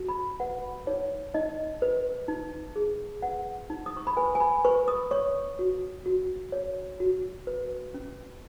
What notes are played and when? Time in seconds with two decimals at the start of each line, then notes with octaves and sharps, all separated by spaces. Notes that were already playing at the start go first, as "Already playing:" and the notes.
Already playing: F#4
0.09 B5
0.40 B4 F#5
0.87 D#4 C#5
1.34 D#4 D#5
1.82 B4
2.28 D#4
2.76 G#4
3.22 B4 F#5
3.70 D#4
3.86 D#6
3.97 C#6
4.07 B5
4.17 B4 G#5
4.35 G#5
4.40 B5
4.65 B4 C#6
4.88 D#6
5.11 C#5 C#6
5.59 F#4
6.06 F#4
6.52 C#5
7.00 F#4
7.47 B4
7.94 C#4